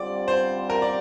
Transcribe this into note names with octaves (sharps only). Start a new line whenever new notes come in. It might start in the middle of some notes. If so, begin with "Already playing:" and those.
Already playing: D3 G3 C4 F4 D5
C5
A#4
D5